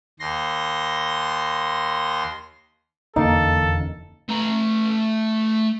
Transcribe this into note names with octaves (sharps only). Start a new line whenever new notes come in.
D#2 C6 A#6
F1 E2 D3 A#3 D#4 A4
A3 A#5